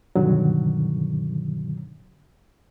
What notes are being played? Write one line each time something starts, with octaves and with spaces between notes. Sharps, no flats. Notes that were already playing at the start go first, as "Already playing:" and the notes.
G2 B2 D3 D#3 F#3